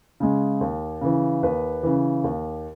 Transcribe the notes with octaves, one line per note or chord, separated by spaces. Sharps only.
C#3 G#3
D#2
C#3 E3
D#2 B4
C#3 E3
D#2